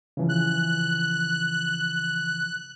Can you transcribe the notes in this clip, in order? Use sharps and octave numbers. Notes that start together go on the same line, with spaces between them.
C#3 E3 F3
F#6